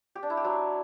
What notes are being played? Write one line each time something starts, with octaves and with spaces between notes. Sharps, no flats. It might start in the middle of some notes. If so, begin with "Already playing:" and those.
G4
D4
E4
G4
F#3